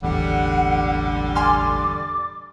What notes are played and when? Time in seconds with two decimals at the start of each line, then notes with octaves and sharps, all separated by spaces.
0.02 E1 A1 E2 D3 G3 F#5
1.36 D5 G#5 C6 D6 F6